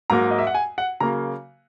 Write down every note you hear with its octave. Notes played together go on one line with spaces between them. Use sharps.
G#2 F#3 A#3 A#5
D#5
E5
F#5
G#5
F#5
C#3 F#3 A#3 A#5